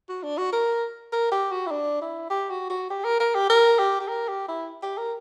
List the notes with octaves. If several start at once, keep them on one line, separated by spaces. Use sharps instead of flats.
F#4
D4
F#4
A#4
A#4
G4
F#4
E4
D4
E4
G4
F#4
F#4
G4
A#4
A#4
G4
A#4
G4
G4
A#4
G4
E4
G4
A#4